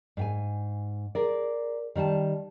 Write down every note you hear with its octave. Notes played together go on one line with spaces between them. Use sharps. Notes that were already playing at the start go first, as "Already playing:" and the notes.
G#2 G5 G#5
G#4 A#4 D5
D#3 G3 F#5 A5